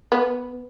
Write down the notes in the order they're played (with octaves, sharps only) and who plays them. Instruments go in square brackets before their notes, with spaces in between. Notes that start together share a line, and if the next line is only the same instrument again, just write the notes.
[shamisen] B3